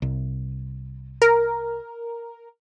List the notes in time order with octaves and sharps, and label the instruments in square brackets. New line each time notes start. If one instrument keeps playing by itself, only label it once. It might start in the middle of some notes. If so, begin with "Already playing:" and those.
[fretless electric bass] C2
[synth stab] A#4